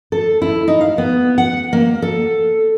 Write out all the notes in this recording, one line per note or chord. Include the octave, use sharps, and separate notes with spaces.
A4
E4
D#4
F5
B3
F#5
A#3
A4